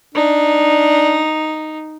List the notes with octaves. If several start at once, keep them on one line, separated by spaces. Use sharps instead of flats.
D4 D#4